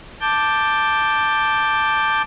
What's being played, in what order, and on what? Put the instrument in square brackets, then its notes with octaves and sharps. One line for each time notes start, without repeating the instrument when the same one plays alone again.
[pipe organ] A5 D6 G6